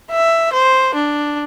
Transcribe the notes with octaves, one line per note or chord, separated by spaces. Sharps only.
E5
C5
D4